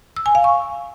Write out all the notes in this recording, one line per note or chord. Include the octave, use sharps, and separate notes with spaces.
E6
G#5
F5
C#6